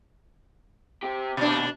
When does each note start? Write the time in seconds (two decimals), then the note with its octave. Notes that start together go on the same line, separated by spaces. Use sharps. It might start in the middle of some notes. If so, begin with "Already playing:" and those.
1.03 C4 G4
1.37 D#2 B2 D4